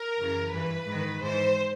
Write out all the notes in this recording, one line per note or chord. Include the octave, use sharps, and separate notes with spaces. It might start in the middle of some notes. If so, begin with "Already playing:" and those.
Already playing: A#4
F#2 C#3 E3
G2 E3 B4
G#2
D#3
G#2 E3 C5